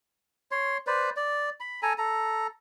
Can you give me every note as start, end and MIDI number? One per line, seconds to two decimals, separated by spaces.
0.51 0.77 73
0.51 0.77 84
0.87 1.10 71
0.87 1.10 72
0.87 1.10 74
1.16 1.50 74
1.60 1.81 83
1.82 1.93 69
1.82 1.93 80
1.82 1.93 82
1.98 2.47 69
1.98 2.47 82